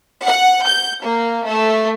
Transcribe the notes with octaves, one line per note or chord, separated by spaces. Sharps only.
F#5
G6
A#3
A3